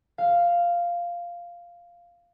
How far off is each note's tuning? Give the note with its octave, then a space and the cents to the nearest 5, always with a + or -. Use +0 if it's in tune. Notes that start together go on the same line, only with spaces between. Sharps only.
F5 -5